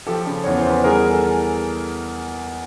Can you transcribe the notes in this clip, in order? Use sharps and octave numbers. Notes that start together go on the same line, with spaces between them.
F3 G4 A4
C#3
E2 C#5
C5
E2
B4
G3 G#4 A#4
E3 G#4
A4